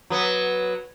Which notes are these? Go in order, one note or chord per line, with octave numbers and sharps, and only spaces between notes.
F#3 B3